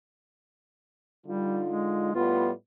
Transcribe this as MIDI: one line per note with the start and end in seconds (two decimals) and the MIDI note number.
1.27 2.15 50
1.27 1.62 55
1.27 2.15 63
1.27 2.15 65
1.68 2.11 56
2.15 2.51 45
2.15 2.51 55
2.15 2.51 59
2.15 2.51 65